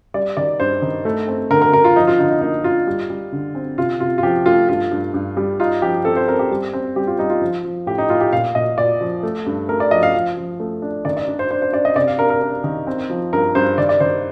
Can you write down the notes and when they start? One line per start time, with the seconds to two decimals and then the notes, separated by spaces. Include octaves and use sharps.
0.14 G3 D5
0.37 D#3 D5
0.60 G2 C5
0.82 D#3
1.05 A3
1.28 C4
1.50 D3 A#4
1.62 A#4
1.73 D3 A#4
1.84 F4
1.96 F3 D#4
2.07 F4
2.19 D3 D#4
2.30 D#4
2.41 A#3 D#4
2.64 D#4 F4
2.87 G3
3.10 G3
3.32 D3
3.55 C4
3.78 C3 F4
4.00 C3 F4
4.18 F4
4.23 F3 G4
4.46 A3 F4
4.69 G2 F4
4.91 G2
5.14 G2
5.37 G3
5.60 D#4 F4
5.82 F3 G4
6.05 C4 A4
6.17 C5
6.28 C4 A#4
6.39 G4
6.51 G3
6.73 C4
6.96 G3 G4
7.07 F4
7.19 G3 D#4
7.30 F4
7.41 F3
7.64 F3
7.87 A2 G4
7.98 D#4
8.10 A2 F4
8.21 G4
8.32 A#2 F5
8.55 A#2 D#5
8.78 A#2 D5
9.01 F3
9.23 A3
9.46 G2
9.69 A3 A#4
9.80 D5
9.91 F3 D#5
10.03 F5
10.14 F3
10.37 F3
10.60 A3
10.82 D4
11.05 D#3 D5
11.17 D5
11.27 D4
11.39 C5
11.51 D4 C5
11.62 C5
11.73 D4 D5
11.85 D#5
11.96 C3 D5
12.07 F5
12.18 D4 A#4
12.30 A#4
12.41 D4
12.64 D#3
12.87 C4
13.10 F3
13.32 G2 A#4
13.55 G2 C5
13.78 D#3 D5
13.89 D5
14.00 D#3 C5